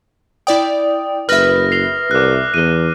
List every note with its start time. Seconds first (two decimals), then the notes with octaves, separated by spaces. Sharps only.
0.47 E4 D5 G5 D#6
1.29 F#1 B4 E5 F6 A#6
1.72 C7 F7 G7
2.11 C2 D6 F#6
2.54 E2 D#7 G7